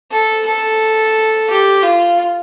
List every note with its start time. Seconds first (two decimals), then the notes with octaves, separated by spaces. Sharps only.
0.11 A4
0.46 A4
1.49 G4
1.83 F4